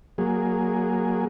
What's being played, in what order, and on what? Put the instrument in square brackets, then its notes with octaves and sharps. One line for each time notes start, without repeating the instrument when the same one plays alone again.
[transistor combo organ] F#3 A#3 G#4